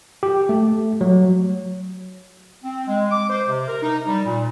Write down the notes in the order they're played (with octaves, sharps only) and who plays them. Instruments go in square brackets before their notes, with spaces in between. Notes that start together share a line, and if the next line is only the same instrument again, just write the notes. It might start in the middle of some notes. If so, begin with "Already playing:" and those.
[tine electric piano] G4
A3
F#3
[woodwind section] C4
G#3
D6
C5
C3
A#4
D#4
G3
A#2